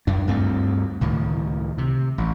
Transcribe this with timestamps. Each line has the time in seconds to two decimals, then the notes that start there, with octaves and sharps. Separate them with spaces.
0.07 F#2 D4
0.27 D2 G2 A3 C4
1.01 C#2 A2 D#3
1.78 C3
2.18 A1